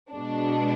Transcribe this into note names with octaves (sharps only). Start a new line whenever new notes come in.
B2 G#3 D4